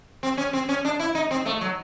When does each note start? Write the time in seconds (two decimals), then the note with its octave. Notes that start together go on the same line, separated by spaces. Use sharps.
0.23 C4
0.37 C#4
0.53 C4
0.69 C#4
0.85 D4
0.99 E4
1.15 D#4
1.31 C4
1.45 A3
1.61 F#3